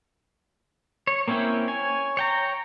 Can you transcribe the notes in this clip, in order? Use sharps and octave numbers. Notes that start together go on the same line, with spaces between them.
C#5
A#3 C4 C#4 E4 G5
C#5 G#5
C#5 G5 A#5